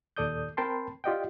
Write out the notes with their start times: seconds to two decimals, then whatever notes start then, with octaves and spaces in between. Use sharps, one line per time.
0.17 D#2 A#2 A4 D5 D#6 G6
0.57 C4 A#4 G5 A5 B5 C6
1.04 F4 G4 D5 D#5 F#5 G5